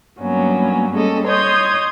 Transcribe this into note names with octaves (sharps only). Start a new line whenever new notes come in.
G2 F#3 A#3 B3 C#4
G3 G#3 A#3 C#4 A4 D#5
C#5 D#5 C6 D#6 G6 G#6